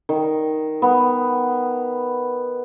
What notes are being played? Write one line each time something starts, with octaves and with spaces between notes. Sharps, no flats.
D#3
B3